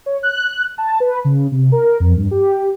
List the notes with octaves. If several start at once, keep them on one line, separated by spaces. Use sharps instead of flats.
C#5
F#6
A5
B4
C#3
C3
A#4
F2
G2
G4